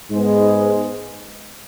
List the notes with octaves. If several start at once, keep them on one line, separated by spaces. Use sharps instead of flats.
G#2 G#3 B3